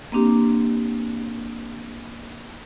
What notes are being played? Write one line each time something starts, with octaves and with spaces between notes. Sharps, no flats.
A#3 C4 D4 G4